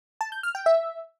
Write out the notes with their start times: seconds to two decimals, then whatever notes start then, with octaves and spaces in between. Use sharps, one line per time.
0.21 A5
0.32 G6
0.43 F6
0.55 G5
0.66 E5